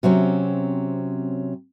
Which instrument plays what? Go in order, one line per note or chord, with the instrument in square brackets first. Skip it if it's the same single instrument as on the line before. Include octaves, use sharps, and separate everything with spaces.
[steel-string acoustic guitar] C3 F#3 C4 C#4